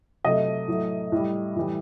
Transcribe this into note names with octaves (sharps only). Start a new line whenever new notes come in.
C3 F#3 A3 D#5
A2 F#3 A3
A2 G3
A2 E3 G3